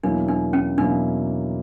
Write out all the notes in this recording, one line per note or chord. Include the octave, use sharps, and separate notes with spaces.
E2 B2 F#3 A#3 D4 E4
D4
C#4
E2 B2 F#3 A#3 D4 E4